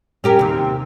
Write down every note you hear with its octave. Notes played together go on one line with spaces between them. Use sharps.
C#4 G4 A#4
D#2 C3